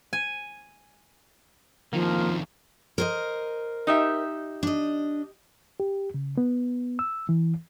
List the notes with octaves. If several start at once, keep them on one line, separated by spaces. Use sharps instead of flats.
G#5
F2 D#3 F3 A#3
A#4 C5 D#5
D#4 G4 E5
D4 D#5
G4
C#3
B3
E6
E3